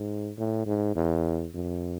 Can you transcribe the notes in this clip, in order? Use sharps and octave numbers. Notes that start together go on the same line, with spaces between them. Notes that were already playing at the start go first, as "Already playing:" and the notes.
Already playing: G#2
A2
G#2
E2
F2